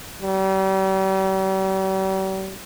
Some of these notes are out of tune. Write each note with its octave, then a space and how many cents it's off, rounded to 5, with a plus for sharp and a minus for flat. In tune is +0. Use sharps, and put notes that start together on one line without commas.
G3 -40